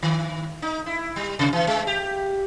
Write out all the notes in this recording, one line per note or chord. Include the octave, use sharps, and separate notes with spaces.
D#3
D#4
E4
G3
C3
E3
G#3
G4